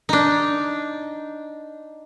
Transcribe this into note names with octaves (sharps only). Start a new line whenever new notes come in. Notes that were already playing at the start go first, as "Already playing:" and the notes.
D4 D#4